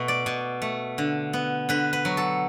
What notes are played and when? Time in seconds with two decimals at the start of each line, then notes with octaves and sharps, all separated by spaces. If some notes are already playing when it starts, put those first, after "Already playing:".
Already playing: B2 A3 B4
0.08 D5
0.26 B2
0.62 A3
0.98 D3
1.33 B3
1.69 D3 B4
1.93 B4
2.05 F#3
2.17 A4